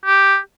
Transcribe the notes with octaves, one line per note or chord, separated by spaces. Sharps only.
G4